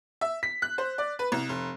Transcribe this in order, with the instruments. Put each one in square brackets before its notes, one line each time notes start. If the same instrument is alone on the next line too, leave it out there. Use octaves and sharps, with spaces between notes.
[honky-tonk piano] E5
B6
F#6
C5
D5
B4
C2
F1